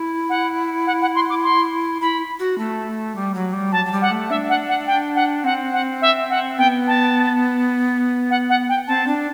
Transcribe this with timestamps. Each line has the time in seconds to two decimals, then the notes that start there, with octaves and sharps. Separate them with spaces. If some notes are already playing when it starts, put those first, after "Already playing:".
Already playing: E4
0.29 F#5
0.86 F#5
1.01 F#5
1.15 C6
1.30 D6
1.44 C6
2.01 E4 B5
2.39 F#4
2.58 A3
3.16 G3
3.34 F#3
3.53 G3
3.72 F#3 A5
3.85 F#3
3.92 G3
4.02 F#5
4.11 A3
4.30 D4 E5
4.49 F#5
4.68 F#5
4.87 G5
5.15 F#5
5.44 C4 F#5
5.73 F#5
6.02 E5
6.30 F#5
6.58 B3 G5
6.87 A5
8.30 F#5
8.49 F#5
8.69 G5
8.87 C4 A5
9.07 D4